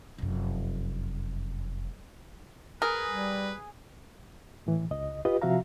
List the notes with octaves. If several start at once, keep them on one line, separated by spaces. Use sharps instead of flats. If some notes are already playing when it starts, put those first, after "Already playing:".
F1 F#2
G#4 A#4 B4
G3
A2 E3
C#2 D#5
F4 G4 B4 D#5
C3 F3 F#4 E5 F5 A#5